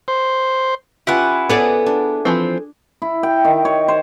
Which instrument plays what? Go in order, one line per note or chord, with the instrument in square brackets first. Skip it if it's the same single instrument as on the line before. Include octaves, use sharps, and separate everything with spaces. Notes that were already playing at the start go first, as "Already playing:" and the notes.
[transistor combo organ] C5
[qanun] C#4 F4 G4 [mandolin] E4 B4 F#5
[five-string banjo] B3 [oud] G#4 A4 D5
[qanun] D4
[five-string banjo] E3 F3 C4
[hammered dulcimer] E4
G5
D#3
C#5
C5